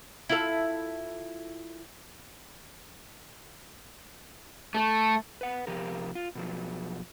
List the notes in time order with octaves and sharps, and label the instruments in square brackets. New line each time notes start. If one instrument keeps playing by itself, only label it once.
[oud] E4 F4 A4
[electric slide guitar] A3
B4 F#5
C3 F3 G4 A#4
F4
B2 F3 F#3